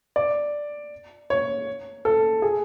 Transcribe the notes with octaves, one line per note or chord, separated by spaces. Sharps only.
D5
C#5
A4
G#4